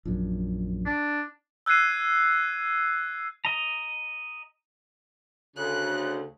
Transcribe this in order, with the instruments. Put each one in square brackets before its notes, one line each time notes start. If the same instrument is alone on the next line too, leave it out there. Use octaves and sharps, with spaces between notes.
[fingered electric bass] A#1 F#2
[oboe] D4
[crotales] E6 F#6 G#6 C7 D#7
[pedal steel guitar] D#5 A#5
[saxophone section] D2 C#3 [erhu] F#6